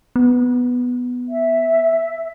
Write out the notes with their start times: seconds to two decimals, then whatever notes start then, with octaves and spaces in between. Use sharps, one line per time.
0.16 B3
1.29 E5